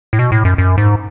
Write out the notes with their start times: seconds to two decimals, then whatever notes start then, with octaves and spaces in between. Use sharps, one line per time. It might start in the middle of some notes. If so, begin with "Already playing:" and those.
0.13 A2
0.19 B2
0.32 A2
0.45 F#2
0.58 F#2
0.78 G#2